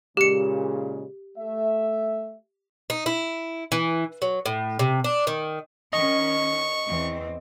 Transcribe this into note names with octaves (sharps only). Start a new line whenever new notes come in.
A#2 C#3 G#3 G4 C#7
A3 E5
D#4
E4
E3
F#3
A2
C3
D4
D#3
D#3 C#4 D#5 C#6
E2 E3 C4